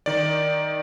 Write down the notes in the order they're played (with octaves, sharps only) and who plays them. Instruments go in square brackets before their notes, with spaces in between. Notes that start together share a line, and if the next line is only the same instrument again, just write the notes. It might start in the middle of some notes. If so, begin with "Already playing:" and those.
[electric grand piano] D#3 D5